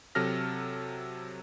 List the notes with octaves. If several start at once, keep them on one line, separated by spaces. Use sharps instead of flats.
C3 F#3 A4 F6 A#6